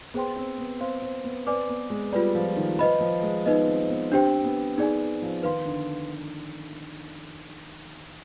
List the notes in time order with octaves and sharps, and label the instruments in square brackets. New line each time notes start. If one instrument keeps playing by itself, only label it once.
[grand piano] B3 [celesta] G#4 C5 G5 C6
[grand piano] C4
B3
[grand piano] C4 [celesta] C5 F5 C6
[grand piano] C4
B3
[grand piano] C4 [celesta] B4 D5 G#5 D6
[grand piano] B3
G#3
[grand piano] G3 [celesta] F4 B4 D5
[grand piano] F3
D#3
[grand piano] F3 [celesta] B4 D#5 B5
[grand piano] F3
G#3
[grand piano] B3 [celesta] D#4 B4 D#5
[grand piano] C4
C4
B3
[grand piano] C4 [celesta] D4 G4 C5 G5
[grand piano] B3
[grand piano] B3 [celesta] D#4 G#4 D5 G#5
[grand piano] F3
[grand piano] D#3 [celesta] B4 F5 C6
[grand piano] D3